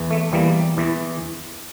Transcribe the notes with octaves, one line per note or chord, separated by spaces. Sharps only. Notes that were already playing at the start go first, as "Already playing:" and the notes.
Already playing: E2 E3
A3
E2 E3 G3 A#3
E2 E3